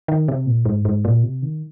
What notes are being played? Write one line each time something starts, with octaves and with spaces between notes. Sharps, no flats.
D#3
C3
A#2
G#2
G#2
A#2
C3
D#3